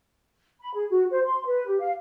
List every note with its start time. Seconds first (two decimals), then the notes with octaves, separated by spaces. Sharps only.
0.61 B5
0.74 G#4
0.90 F#4
1.11 C5
1.25 C6
1.45 B4
1.67 G4
1.80 F5